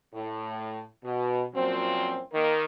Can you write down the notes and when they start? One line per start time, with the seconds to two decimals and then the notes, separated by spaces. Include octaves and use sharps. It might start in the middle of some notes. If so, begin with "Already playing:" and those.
0.13 A2
1.04 B2
1.54 F#2 A#2 F3 F#3 C4
2.33 D#3 A#3